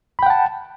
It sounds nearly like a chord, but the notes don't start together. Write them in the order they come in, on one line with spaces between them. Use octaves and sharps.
B5 G5 F#5 A5